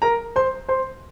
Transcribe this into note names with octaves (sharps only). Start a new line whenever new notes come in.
A#4 A#5
C5 C6
C5 C6